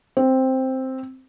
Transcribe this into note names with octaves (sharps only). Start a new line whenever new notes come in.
C4